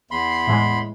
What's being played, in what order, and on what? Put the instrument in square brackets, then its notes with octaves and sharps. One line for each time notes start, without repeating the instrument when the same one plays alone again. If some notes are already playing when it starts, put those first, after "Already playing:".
[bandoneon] E2 B5 C6
[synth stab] C7
A2 E3 G#3